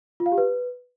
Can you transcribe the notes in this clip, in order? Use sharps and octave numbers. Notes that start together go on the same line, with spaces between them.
F4
F5
G4
B4